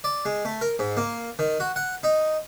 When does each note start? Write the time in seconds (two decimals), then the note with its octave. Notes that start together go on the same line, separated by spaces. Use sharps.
0.04 D5
0.25 G#3
0.45 A3
0.61 A#4
0.79 G#2
0.97 A#3
1.39 D#3
1.60 F#4
1.76 F#5
2.03 D#4